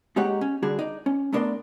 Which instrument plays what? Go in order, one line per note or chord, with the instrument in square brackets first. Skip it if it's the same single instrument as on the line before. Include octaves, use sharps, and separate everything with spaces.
[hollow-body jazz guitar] G#3 A#3 D#4 G4 C#5 F#5
C#4
D3 G3 D4 F#4 G#4
D#4 D5
C#4
A3 B3 D4 A#4 D5 C6